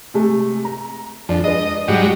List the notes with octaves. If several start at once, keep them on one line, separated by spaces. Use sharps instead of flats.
C3 G#3 A3
A#5
F2 D4
G#3 D4 B4 D#5
G#2 F#3 G3